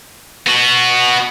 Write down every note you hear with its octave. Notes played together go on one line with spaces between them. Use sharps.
B3 F#4